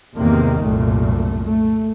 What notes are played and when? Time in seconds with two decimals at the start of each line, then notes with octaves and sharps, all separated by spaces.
0.17 E2 G#2 C3 D#3 A#3
0.64 C2 F#2 A#2 A3
1.46 A3